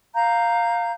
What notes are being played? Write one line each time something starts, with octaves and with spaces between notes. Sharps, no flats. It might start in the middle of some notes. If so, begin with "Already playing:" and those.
F5 A#5 G6